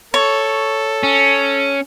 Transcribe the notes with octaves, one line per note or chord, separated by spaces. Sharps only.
A4 C#5
C#4